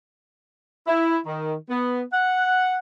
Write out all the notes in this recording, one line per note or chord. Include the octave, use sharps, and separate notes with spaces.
E4
D#3
B3
F#5